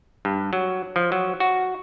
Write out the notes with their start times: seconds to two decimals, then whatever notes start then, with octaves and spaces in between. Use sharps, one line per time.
0.25 G2
0.53 F#3
0.96 F3
1.12 F#3
1.40 F#4